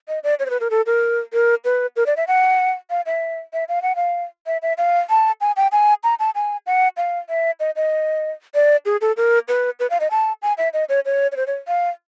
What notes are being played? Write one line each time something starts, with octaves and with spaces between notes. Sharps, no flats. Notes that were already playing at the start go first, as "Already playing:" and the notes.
D#5
D5
C#5
C5
B4
A#4
A4
A#4
A#4
B4
A#4
D5
E5
F#5
F5
E5
E5
F5
F#5
F5
E5
E5
F5
A5
G#5
G5
G#5
A#5
A5
G#5
F#5
F5
E5
D#5
D#5
D5
G#4
A4
A#4
B4
B4
F5
D#5
A5
G#5
E5
D#5
C#5
C#5
C#5
C5
C#5
F5